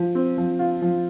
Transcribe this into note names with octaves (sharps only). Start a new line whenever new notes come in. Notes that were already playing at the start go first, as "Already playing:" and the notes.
Already playing: F3
C4
F3
F4
F3